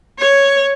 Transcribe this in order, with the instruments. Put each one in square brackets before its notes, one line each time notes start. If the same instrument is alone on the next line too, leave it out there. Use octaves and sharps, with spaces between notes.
[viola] C#5